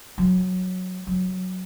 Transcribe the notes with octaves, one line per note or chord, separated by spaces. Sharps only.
F#3
F#3